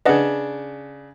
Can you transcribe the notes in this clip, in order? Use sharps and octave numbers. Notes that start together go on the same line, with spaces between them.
C#3 D4 B4 D#5 F#5